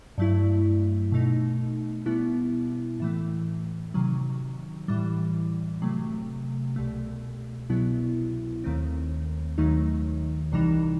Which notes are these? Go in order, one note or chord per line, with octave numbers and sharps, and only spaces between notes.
G2 F#3 A3 E4
B2 A3 D#4
B2 G3 B3 E4
A2 E3 A3
C3 D#3 F#3
A2 E3 G3
C3 F#3 A3
C2 B2 A3
C2 B2 F#3 B3 E4
D#2 D#3 A3 C4
D#2 D#3 F#3 A3 D#4
C2 C3 E3 G3 D#4